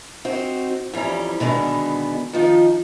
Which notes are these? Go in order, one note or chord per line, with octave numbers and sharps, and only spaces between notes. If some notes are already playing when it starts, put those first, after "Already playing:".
C4 D#4 F#4
F2 E3 G3 C#4 A#5
B2 D3 D#3 G#3 B3
D#3 F3 D#4